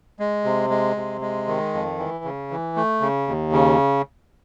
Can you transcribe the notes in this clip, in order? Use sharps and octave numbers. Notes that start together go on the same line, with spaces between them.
G#3
C3
G#3
C3
G#3
D#3
F2
E3
C#3
E3
A3
C#3
D#2
C#3